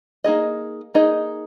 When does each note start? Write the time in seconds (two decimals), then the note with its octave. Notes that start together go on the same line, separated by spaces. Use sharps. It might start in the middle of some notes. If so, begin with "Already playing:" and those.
0.24 A#3 D#4 G#4 D#5
0.94 A#3 D#4 G#4 D#5